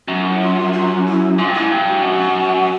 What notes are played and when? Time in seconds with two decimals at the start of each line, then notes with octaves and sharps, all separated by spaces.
0.08 F#2 F#4
0.18 F4
0.30 E4
0.41 F4
0.73 F4
1.06 E4
1.38 G#2 F4
1.48 G2
1.54 G#2 E4
1.71 G2
1.86 F#4
2.03 F#2